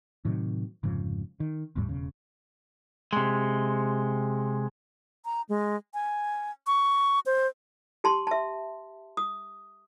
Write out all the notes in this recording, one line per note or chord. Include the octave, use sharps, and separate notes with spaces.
A2 C3 D#3 F#3
F1 G#2 C#3 F3
D#3
G1 E2 A2 G3
E1 C#3
C3 G#3
A#5
G#3
G#5
C#6
C5
G4 A5 C6
E5 A5
D#6